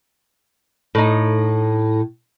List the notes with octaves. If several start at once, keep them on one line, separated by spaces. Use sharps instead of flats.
A2 D#4